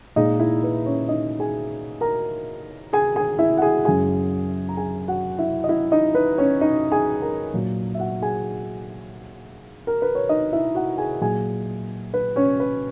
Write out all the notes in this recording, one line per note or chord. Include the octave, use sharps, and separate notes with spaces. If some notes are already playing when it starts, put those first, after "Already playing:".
A#2 G#3 D#4 D#5
E4 E5
B4
C#4 C#5
D#4 D#5
G#4 G#5
A#4 A#5
G#4 G#5
G#4 G#5
E4 E5
F#5
G#4 G#5
F#2 C#3 G#3 G#4 G#5
A#5
G#4 G#5
F#4 F#5
E4 E5
D#5
E4 E5
D#4 D#5
B4
C#4 C#5
D#4 D#5
G#4 G#5
A#4 A#5
A#2 F#3
E5
F#4 F#5
G#4 G#5
A#4
B4
C#5
D#4 D#5
E4 E5
F#4 F#5
G#4 G#5
A#2 F#3 G#4 G#5
B4
C#4 C#5
B4